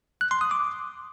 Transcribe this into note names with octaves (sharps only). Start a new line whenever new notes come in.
F#6
C6
D#6
D6